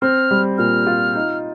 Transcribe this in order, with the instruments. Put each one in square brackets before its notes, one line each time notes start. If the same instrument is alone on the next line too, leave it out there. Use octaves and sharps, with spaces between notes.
[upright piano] C4 [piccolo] F6
[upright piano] G3
[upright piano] A#2 [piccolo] F6
[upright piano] F4
D#4